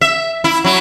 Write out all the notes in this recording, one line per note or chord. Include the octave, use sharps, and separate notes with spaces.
E5
E4
F#3 E4